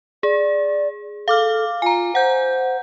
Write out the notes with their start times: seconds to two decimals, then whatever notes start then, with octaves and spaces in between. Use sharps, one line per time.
0.23 G#4 D5
1.28 A4 F5 D6 F6
1.82 F4 G#5 A#5
2.15 C5 F#5 G6